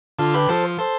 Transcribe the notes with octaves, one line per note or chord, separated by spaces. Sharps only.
D3 F4 A4
G4 B4
F3 A4 C5
A4 C5